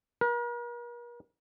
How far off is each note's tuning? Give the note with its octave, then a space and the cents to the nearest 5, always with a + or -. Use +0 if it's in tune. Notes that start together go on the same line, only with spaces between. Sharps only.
A#4 +45